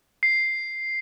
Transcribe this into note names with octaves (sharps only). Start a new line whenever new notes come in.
C7